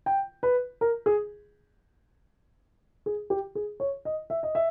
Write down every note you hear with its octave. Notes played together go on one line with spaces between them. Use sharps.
G5
B4
A#4
G#4
G#4
G4
G#4
C#5
D#5
E5
D#5
E5